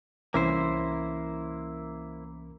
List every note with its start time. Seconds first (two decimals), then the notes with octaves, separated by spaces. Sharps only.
0.34 C2 E3 A#3 C#4 E4 C5